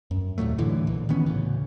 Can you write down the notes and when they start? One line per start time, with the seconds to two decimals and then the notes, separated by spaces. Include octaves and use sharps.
0.11 F#2
0.38 D#2 A#2 F#3 A3
0.58 A2 D3 E3
0.87 A#1
1.09 D#3 E3 B3 C#4
1.26 D2 A2 C#3